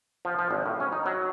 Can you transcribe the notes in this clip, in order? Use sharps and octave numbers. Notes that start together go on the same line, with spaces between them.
F3
F3
G#1
A2
C#4
D#4
F#3